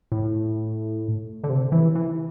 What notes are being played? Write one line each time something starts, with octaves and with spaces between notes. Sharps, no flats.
A2
D3
C3
E3
E3